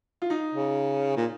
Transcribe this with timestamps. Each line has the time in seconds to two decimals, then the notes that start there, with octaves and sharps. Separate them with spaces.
0.22 F4
0.30 D#4
0.54 C#3
1.17 A#2